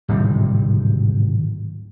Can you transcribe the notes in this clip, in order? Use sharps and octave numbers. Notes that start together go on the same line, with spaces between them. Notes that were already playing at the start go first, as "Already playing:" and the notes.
D1 G#1 C3 G3